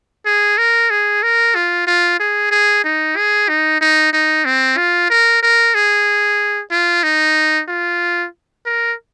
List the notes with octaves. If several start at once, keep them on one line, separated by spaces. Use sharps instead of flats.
G#4
A#4
G#4
A#4
F4
F4
G#4
G#4
D#4
G#4
D#4
D#4
D#4
C4
F4
A#4
A#4
G#4
F4
D#4
F4
A#4